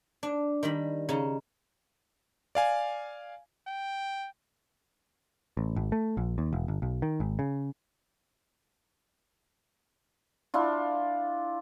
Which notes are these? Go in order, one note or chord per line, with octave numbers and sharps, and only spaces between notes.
D4
D#3 G3 B5
C#3 D#4
D5 F5 G#5
G5
A1
G#1
A3
A#1
D#2
E1
G1
B1
D#3
G#1
C#3
D4 E4 F4